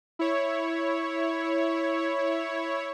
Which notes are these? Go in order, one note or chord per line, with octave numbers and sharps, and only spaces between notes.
E4 C#5